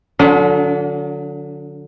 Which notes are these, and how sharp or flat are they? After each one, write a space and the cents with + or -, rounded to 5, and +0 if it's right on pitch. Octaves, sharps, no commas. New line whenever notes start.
D3 +5 F#3 -35 D4 -40